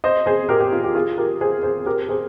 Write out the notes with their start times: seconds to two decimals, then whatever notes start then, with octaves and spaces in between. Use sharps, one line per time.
0.04 C5 D#5
0.26 G#4 C5
0.49 G4 A#4
0.60 G4
0.72 F4
0.84 G4
0.95 F4 G#4
1.18 G4 A#4
1.41 G#4 C5
1.63 G#4 C5
1.86 G4 A#4
2.09 G#4 C5